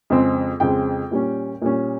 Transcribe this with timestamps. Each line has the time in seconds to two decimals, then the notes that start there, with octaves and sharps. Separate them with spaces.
0.10 F2 C#3 G#3 C4
0.60 F2 C#3 G#3 C4 G5
1.11 A#2 G3 C#4
1.62 A#2 G3 C#4